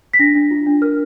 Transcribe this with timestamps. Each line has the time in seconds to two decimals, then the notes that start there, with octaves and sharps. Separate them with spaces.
0.14 B6
0.19 D4 A#6
0.35 D4
0.51 F4
0.66 D4
0.82 A#4 F6